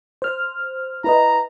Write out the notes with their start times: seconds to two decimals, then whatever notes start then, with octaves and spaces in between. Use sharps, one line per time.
0.22 C5 F6
1.04 E4 B4 D#5 A#5